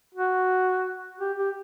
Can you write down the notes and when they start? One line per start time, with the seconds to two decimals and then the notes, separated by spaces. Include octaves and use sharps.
0.15 F#4
1.20 G4
1.38 G4